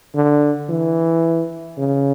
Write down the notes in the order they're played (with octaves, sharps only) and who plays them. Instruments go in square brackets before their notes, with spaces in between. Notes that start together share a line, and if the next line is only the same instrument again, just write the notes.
[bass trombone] D3
E3
C#3